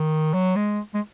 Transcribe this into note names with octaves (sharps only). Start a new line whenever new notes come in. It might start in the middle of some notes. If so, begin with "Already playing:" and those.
Already playing: D#3
F#3
G#3
G#3